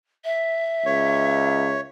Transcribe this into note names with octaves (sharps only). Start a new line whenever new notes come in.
E5
C#2 C#5